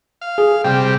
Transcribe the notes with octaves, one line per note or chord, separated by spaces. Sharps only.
F5
G#4
C3 G3 G5